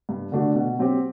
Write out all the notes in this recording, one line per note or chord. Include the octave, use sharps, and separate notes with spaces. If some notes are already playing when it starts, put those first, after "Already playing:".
G2
D3 A3 D4 F#4
B2
F#3 C4 G4